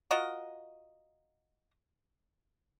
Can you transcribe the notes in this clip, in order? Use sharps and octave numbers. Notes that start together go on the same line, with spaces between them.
F4 F#4 A#4 D#5